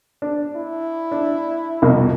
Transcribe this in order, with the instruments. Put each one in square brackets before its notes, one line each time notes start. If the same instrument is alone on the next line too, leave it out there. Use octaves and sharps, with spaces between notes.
[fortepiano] D4
[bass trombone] E4
[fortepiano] D4
C2 F2 B2